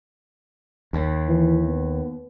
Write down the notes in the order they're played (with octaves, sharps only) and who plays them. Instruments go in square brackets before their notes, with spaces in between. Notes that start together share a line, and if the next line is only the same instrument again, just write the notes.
[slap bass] D#2
[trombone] E3
B3